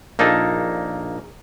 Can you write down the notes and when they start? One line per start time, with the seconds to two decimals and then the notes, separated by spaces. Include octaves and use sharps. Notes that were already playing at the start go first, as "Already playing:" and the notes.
0.19 A#1 A#3 D#4 A4 A5